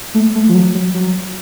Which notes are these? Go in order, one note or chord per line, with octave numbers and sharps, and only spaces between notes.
A3
A3
F3
F#3
F#3
F#3